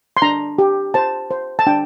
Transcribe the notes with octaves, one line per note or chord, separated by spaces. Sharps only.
C6
D4 A#5
G4
C5 A5
C5
A5
D4 G5